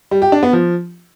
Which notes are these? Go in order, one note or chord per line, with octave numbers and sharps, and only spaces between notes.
G3
G4
D4
B3
F3